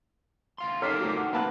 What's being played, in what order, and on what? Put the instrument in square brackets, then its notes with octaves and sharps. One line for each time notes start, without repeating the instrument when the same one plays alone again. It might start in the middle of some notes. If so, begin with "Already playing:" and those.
[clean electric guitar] D2 F5 C6
[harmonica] A#3 G4 [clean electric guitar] D#4 A4 [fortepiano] C#5 [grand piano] F6 B6 C7
[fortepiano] D2 F#3
[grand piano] F#5
[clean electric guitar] A#3 C4 A#4 [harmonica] B4 [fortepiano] F5 A5 F#6